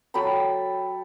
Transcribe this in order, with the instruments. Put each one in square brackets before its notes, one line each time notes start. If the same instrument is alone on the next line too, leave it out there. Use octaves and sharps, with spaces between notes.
[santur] F#3 A4 G5 B5